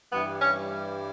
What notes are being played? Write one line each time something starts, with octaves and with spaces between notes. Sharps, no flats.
G2 E3 G3 B3
C#4